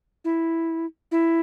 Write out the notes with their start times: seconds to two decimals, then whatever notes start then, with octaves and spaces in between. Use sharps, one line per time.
0.25 E4
1.12 E4